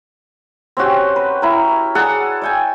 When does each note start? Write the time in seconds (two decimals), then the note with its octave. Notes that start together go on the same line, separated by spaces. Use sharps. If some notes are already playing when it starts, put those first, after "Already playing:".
0.77 C4 C#4 F#4 G4
1.16 B4
1.42 E4 A#4
1.95 G#4 A4 D5 F#5
2.42 D5 G5 G#5